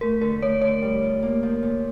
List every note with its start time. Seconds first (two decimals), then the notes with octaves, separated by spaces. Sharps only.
0.01 A3 A#4
0.21 D3 A#4
0.42 A3 C#5
0.61 D3 C#5
0.82 G3
1.03 F4
1.23 A#3
1.43 F3
1.63 A#2